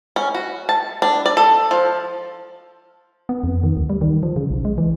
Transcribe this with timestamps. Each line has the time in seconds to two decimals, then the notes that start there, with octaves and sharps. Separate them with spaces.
0.16 C#4
0.35 F#4
0.69 A5
1.02 D4
1.26 D5
1.37 A4
1.71 F3
3.29 B3
3.44 F2
3.63 D#3
3.77 D2
3.90 G3
4.01 D#3
4.23 F3
4.36 C#3
4.51 B1
4.65 G#3
4.78 E3